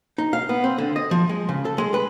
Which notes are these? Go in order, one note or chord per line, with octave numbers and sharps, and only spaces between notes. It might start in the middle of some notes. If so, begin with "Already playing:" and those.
D#4
F5
B3
C4
D3
D#5
F3
G#3
C#3
A4
G#3
B4